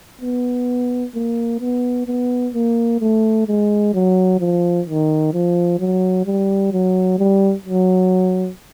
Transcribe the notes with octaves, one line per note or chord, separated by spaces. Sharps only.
B3
A#3
B3
B3
A#3
A3
G#3
F#3
F3
D#3
F3
F#3
G3
F#3
G3
F#3